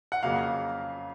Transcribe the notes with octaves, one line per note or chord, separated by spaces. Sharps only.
F#5
F2 C#3 F#3 A#3 F5